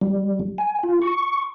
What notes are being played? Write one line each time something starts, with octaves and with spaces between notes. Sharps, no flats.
G3
G#5
F4
C#6